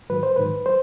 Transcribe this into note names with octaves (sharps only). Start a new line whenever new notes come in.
G#2 D#3 F#3 B4
C5
G#2 D#3 F#3 B4
F#3 C5